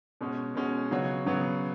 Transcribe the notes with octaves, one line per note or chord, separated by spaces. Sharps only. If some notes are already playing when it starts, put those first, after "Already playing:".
B2 G#3 C#4 F#4
B2 G#3 C#4 F#4
C#3 F#3 B3 F#4 C#5
C#3 F#3 B3 F#4 C#5